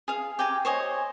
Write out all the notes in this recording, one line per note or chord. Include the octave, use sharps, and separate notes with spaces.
G#4 F5
G4 G5 G#5 A#5
C5 C#5 D#5 G#5